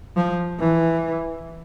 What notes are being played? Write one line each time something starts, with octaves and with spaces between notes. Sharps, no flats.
F3
E3